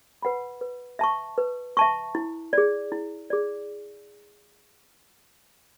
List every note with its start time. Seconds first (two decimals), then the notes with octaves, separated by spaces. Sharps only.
0.22 B4 F#5 B5
0.61 B4
0.99 E5 A5 C#6
1.38 B4
1.77 E5 A5 C#6
2.15 E4
2.53 G#4 D5
2.92 E4
3.30 G#4 D5